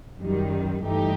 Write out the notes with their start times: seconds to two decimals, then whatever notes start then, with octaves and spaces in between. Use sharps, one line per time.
0.20 F#2 D#3 G3
0.84 G2 E3 A3 D#4 G4